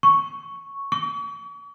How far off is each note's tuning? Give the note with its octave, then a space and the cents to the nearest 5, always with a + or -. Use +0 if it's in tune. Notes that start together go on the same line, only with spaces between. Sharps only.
C#6 +0
C#6 +40